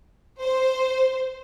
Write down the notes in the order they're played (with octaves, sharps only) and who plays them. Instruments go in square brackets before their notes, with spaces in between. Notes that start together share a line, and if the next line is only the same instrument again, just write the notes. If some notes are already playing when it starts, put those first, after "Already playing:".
[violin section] C5